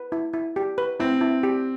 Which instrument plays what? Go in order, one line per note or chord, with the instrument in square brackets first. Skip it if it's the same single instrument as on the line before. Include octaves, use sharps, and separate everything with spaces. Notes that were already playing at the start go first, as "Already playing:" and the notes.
Already playing: [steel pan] B4
E4
E4
G4
B4
[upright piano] C4 [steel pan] E4
[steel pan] E4
G4